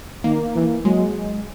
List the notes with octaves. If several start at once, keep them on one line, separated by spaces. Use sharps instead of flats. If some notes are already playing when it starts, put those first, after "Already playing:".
D#3 A#3
E3
F#3 G#3